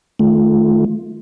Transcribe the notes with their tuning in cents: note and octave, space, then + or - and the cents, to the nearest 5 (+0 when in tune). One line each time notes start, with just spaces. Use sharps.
D#3 -20 A3 -25 F4 +0